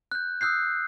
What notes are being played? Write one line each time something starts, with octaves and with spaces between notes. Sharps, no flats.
F#6 G6
D#6 E6 F#6 G6 C7